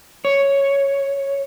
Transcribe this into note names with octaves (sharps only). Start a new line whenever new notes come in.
C#5